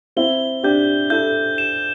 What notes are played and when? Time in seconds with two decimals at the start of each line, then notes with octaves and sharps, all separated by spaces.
0.17 C4 E4 G7
0.63 D4 G4 G6
1.10 E4 A4 G6
1.58 E7